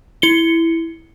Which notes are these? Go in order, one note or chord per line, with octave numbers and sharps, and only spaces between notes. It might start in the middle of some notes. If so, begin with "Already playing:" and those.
E4 C#7 G7